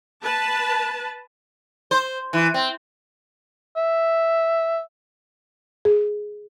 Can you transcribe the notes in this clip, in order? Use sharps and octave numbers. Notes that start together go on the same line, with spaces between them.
B4 A5
C5
E3
C4
E5
G#4